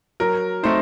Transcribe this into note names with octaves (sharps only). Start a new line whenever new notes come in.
F#3 A#4
A3 C4 D#4 C5